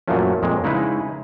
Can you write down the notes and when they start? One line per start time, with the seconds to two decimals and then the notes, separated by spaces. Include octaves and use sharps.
0.08 F#2 A#2 F3 F#3 A3 C#4
0.43 F2 A#2 G#3
0.64 C#3 G#3 D#4 E4 B4